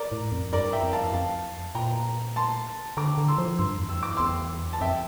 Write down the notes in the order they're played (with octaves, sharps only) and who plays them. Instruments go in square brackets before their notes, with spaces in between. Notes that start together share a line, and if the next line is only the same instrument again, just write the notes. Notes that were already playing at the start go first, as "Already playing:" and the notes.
Already playing: [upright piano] A#4 D5
[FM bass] A2
F2
[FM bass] G2 [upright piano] A#4 D5
[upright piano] E5 G5
[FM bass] F2
[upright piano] F5 A5
[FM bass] F2 [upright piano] F5 A5
[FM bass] A#2 [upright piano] G5 A#5
[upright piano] A5 C6
[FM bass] D3 [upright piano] A#5 D6
[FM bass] D3
[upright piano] C6 E6
[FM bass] F3
[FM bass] G2 [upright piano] C6 E6
[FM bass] E2
[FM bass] F2 [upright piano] E6
[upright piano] D6
[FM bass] E2 [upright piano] C6 E6
[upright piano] A5
[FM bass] F2 [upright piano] E5 G5